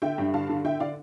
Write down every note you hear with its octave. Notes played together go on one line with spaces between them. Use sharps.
D3 E5 G5
G2
D3 F5 A5
D3
D3 E5 G5
D3 D5 F5